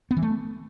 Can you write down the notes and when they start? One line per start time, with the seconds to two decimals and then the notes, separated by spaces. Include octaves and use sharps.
0.11 B3
0.17 E3
0.22 A3